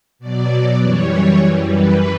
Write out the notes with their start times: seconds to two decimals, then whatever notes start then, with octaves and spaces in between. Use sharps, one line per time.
0.19 B2 F#3 D5
0.79 F#2 E3 G3 C#5
1.38 F#2 E3 G3
1.68 B4